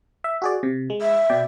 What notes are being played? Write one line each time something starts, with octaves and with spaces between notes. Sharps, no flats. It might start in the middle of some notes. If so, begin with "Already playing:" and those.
E5
F#4 G#4 D5
C3
G#3
E5
B2 D5 G5